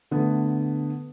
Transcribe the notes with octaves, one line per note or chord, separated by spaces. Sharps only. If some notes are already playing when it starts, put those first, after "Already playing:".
D3 A3 B3